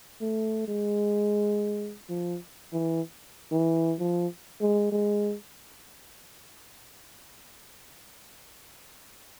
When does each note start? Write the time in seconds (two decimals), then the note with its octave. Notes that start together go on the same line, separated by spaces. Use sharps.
0.21 A3
0.68 G#3
2.09 F3
2.73 E3
3.52 E3
3.99 F3
4.61 G#3
4.92 G#3